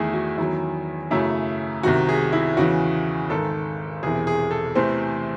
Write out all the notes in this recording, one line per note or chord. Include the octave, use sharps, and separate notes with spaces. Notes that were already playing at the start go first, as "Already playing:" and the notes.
Already playing: E2 D#3 A3 E4 G#4
F#4
E2 D#3 F#3 E4
F#2 C#3 F#3 A3 E4
C2 C3 D#3 F#4
G#4
E4
E2 C#3 E3 F#4
G#1 G#2 D#3 A4
E1 E2 C3 E3 G#4
G#4
A4
E2 C3 E3 A3 C5